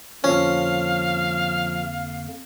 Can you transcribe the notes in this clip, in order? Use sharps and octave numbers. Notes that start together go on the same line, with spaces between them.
F2 D3 F3 A#3 C#4 A4 F5